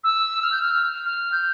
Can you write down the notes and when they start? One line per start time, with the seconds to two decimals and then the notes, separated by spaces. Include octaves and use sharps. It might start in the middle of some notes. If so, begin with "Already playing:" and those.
0.04 E6
0.42 F6
0.52 G6
0.61 F6
1.06 F6
1.32 G6